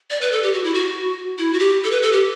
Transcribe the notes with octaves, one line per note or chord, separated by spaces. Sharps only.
D5
B4
A4
G4
F#4
E4
F#4
E4
F#4
G4
A4
B4
A4
G4